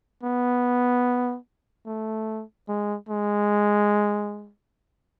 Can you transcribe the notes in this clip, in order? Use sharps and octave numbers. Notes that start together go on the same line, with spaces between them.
B3
A3
G#3
G#3